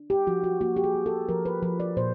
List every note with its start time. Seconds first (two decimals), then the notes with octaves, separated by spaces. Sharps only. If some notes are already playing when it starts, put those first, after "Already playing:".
Already playing: D4
0.10 G4
0.27 F3 F#4
0.44 F#4
0.61 A#3 F#4
0.77 G4
0.84 G#4
0.95 A#3
1.06 A4
1.29 F3 A#4
1.45 B4
1.63 F3 B4
1.80 D5
1.97 A#2 C5